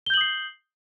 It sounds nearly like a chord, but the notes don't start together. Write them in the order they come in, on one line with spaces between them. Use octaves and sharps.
G7 G6 F#7 D#6 C7